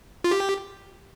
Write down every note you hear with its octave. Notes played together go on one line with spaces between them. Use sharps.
F4
G4